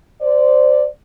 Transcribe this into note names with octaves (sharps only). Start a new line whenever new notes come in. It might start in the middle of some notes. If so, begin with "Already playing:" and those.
C5 D5